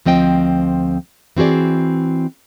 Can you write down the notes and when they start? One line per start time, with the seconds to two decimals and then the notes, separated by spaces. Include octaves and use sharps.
0.05 D2 F3 C4 D#5 G5
1.36 E3 C4 F#4 G#4 D5